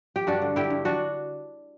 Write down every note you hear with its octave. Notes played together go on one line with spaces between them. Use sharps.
G4
G2 D4 F#4
D3
D3 E4 G4
G2
D4 F#4